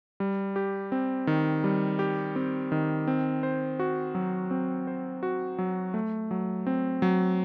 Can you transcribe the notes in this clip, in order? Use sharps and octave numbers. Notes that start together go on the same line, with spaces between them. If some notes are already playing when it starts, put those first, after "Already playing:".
G3
G4
C4
D#3
G3
G4
C4
D#3
C4
C5
F#4
F#3
C4
C5
F#4
F#3
A3
F#3
C4
F#3